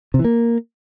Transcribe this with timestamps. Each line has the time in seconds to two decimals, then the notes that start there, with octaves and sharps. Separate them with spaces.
0.14 C3
0.19 E3
0.24 A#3